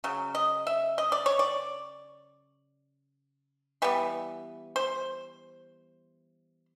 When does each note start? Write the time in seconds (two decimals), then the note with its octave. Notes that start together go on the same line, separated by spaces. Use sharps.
0.04 C#3 F#3
0.35 D#5
0.67 E5
0.98 D#5
1.12 D5
1.26 C#5
1.39 D5
3.82 E3 G3 B3
4.76 C5